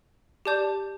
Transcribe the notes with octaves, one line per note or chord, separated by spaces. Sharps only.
G4 D5 A5 D6 G6